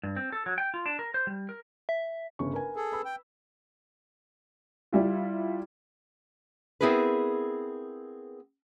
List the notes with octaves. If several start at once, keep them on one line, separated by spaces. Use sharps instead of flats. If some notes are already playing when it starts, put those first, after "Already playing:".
G2
C4
A4
F#3
G5
F4
D4
A#4
C5
G3
A#4
E5
G1 C#3 C#6
A#4 B4 G#5
G#4 A4
B4 B5 E6
G5
G3 E4 F4
B3 C4 E4 G#4 A#4 B4